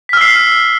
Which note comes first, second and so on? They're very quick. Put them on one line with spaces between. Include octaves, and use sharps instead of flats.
B6 F6 E6 C7